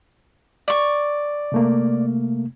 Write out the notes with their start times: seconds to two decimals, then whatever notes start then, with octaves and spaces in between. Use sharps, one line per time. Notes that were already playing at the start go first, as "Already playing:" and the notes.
0.68 D5 C#6
1.52 C3 A3 A#3